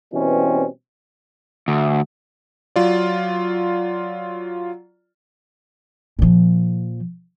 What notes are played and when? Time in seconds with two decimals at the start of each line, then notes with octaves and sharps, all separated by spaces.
0.13 B2 E3 G3 C4 C#4
1.68 D2
2.76 F#3 F4 D5
6.19 A#2 F3